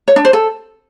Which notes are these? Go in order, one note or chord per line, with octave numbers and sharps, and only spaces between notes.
C#5
D4
C5
A4